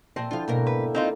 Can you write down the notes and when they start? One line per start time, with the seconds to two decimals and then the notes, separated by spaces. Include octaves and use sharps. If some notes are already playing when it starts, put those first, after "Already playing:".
0.16 A#2 C4 D#5 E5 G5 A5
0.31 D3 F3 E4 F4 G5
0.48 G#2 B2 A#3 A#4
0.67 B4
0.80 E5
0.95 C4 D#4 F4